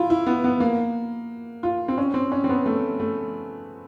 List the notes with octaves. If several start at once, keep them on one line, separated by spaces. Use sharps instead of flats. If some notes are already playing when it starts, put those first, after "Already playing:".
Already playing: E4 F4
E4
B3
B3
A#3
F4
C4
C#4
C4
C#4
C4
B3
A3
A3